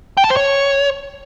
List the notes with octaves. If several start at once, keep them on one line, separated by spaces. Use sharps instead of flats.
G5
A5
C5
C#5